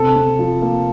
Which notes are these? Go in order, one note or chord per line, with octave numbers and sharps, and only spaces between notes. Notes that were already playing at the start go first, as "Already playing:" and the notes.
Already playing: C3 A4
C3
F3
A#3